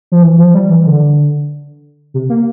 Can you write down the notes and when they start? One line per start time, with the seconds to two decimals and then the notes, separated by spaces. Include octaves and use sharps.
0.12 F3
0.22 E3
0.38 F3
0.54 G3
0.70 E3
0.86 D3
2.14 C3
2.29 A#3